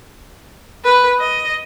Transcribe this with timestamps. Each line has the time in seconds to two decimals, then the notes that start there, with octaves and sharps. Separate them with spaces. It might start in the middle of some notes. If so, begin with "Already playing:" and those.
0.85 B4
1.19 D#5